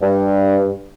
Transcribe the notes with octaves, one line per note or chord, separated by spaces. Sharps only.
G2